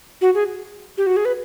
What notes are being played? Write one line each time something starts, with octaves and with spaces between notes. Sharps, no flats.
F#4
G#4
G4
F#4
G#4
B4